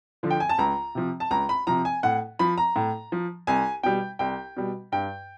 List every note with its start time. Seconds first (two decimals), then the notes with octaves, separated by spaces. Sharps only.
0.23 D3 F3
0.31 G5
0.40 G#5
0.49 A5
0.58 C#2 A#5
0.95 C3 F3
1.20 A5
1.31 C#2 A#5
1.49 B5
1.67 C3 F3 A#5
1.85 G#5
2.03 A2 F#5
2.39 F3 B5
2.58 A#5
2.76 A2
3.12 F3
3.47 C2 G#5
3.83 B2 G3 G5
4.19 C2 G5
4.57 B2 G3
4.92 G2 G5